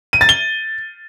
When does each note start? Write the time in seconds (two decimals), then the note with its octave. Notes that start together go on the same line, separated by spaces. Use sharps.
0.13 D#7
0.21 A6
0.29 G7